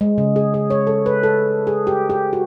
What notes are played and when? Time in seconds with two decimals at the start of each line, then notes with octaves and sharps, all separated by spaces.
0.01 G#3
0.18 C#3
0.36 G#4
0.54 G#4
0.70 C#5
0.87 A4
1.06 B4
1.23 A4
1.67 G#4
1.87 G4
2.10 G4
2.33 F#4